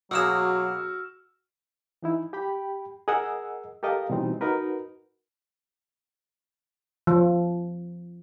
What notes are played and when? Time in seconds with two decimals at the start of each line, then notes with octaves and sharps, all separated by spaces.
0.11 B2 F#3 A#3 F#4 G#4 E6 F6 E7
2.02 E3 D#4 E4
2.33 G4 G5 B5
3.08 G#4 A#4 D#5 F#5 E6
3.83 G4 A4 A#4 D#5 F5
4.10 B2 E3 G3 C4 D#4
4.41 D#4 F#4 A#4 B4
7.07 F3